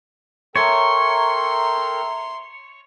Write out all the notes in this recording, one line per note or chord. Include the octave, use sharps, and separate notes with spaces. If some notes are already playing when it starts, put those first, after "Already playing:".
A4 A#4 C#5 E5 G5 A#5 C6